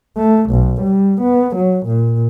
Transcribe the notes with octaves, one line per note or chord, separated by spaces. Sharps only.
A3
B1
G3
B3
F#3
A#2